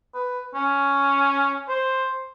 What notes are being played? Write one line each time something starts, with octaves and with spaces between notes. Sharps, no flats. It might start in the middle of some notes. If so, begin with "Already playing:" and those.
B4
C#4
C5